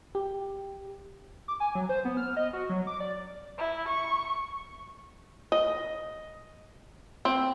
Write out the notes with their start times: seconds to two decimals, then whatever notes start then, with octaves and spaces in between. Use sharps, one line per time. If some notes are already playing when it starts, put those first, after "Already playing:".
0.15 G4
1.48 D6
1.60 G#5
1.75 F#3
1.89 C5
2.05 B3
2.17 F6
2.37 D#5
2.53 F#4
2.69 F#3
2.87 D6
3.00 D5
3.58 E4
3.88 C#6
5.52 D#5
7.25 C4